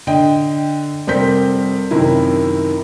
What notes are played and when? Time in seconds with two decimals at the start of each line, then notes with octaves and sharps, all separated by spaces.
0.07 D3 D#5 G5
1.07 F1 G3 C4 A#4 G6 B6
1.91 F#2 C3 D#3 E4